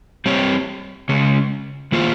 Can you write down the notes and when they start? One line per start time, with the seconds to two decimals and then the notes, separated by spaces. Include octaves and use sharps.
0.26 G3 C4 G4 C#5
1.09 C#3 G#3 C#4
1.92 D#3 A#3 F4 C5